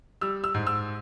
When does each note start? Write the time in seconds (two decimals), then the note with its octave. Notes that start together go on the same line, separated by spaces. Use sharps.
0.21 G3 E6
0.44 E6
0.54 G#2
0.67 E6